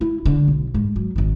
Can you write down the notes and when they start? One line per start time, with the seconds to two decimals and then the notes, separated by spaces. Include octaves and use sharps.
0.01 E4
0.25 D3
0.48 B1
0.74 G#2
0.96 F#3
1.16 G#1 D#3